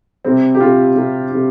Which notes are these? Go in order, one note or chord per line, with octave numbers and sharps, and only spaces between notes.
C3 G3 C4
G4
C3 G3 F4
C3 G3
C3 G3